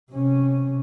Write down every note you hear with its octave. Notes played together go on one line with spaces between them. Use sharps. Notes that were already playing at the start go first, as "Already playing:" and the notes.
C3 C#4